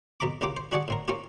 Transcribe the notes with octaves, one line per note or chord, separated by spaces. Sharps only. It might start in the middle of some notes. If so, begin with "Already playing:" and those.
F2 B2 A#5 B5 D6
C2 C#3 A#3 F4 G4 D6
C5
G3 D4 F#4 G#4 D5 F#5
A2 C4 A#4
A#3 C4 C#4 F4 G4